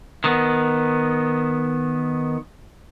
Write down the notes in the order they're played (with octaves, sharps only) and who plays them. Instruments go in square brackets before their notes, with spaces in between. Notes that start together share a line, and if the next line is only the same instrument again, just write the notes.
[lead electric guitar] D#3 B3